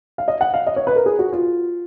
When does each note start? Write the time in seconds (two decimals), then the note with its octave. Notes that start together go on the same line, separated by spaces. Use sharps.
0.18 F5
0.28 D#5
0.41 F#5
0.54 F5
0.67 D#5
0.76 C#5
0.87 B4
0.96 A#4
1.06 G#4
1.19 F#4
1.33 F4